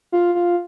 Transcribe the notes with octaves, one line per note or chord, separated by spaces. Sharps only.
F4
F4